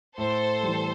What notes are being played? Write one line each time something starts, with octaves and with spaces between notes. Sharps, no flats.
A2 A4 C5
E3 G3